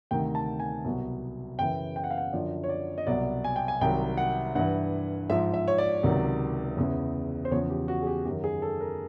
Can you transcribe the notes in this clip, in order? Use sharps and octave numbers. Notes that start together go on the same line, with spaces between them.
D2 C3 D#3 G5
A5
G#5
C2 B2 F#3
F#2 C#3 E3 G5
G5
F#5
F5
F#5
F#2 D3 F3 D5
C#5
D5
D#5
C2 B2 F#3 D5
G#5
G5
G#5
C2 C3 D#3 F#3 G5
F#5
G2 E3 F#5
G#2 F3 E5
E5
C#5
D5
C#2 C3 D#3 F#3
E2 C#3 E3
C5
E2 C#3 F3 C#5
G4
F#4
G#4
G4
F#2 D#3 F#3 G4
G#4
A4
A#4